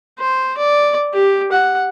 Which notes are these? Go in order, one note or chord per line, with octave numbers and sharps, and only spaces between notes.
C5
D5
G4
F#5